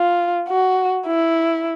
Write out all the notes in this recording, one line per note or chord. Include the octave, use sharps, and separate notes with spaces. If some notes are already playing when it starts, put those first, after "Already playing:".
Already playing: F4
F#4
E4